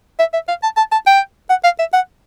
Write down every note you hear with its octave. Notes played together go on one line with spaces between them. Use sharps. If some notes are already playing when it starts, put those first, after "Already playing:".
E5
E5
F5
A5
A5
A5
G5
F#5
F5
E5
F#5